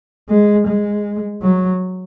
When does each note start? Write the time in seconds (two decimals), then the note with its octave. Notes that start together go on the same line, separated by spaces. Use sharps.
0.30 G#3
0.67 G#3
1.42 F#3